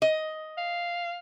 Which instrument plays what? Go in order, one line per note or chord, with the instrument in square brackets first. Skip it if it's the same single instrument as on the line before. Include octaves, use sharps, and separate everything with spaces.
[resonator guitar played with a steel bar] D#5
[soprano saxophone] F5